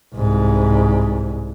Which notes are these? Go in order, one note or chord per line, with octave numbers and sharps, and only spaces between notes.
C2 G#2